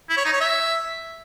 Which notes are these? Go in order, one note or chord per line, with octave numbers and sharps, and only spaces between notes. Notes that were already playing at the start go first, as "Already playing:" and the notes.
E4
C#5
D#4
C#5
E5